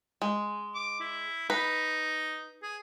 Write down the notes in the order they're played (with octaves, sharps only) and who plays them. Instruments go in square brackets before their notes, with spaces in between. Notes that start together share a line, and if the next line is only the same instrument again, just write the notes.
[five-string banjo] G#3
[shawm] D6
E4
[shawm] D#4 [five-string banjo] B4
[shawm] G#4